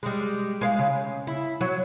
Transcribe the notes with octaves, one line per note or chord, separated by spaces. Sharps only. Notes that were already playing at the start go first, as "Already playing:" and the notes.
G3 G#3
G#3 F5
C#3
E4
F#3